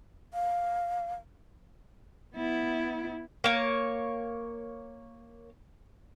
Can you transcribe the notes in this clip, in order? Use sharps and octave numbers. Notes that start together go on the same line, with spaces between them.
F5
B3 E4
A#3 C#5